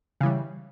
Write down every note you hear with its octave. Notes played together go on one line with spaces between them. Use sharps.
C#3 E3 G3